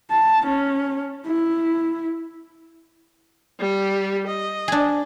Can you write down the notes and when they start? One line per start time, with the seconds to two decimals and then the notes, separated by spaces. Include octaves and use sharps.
0.11 A5
0.47 C#4
1.26 E4
3.60 G3 G4
4.27 D#5
4.68 D4 G#4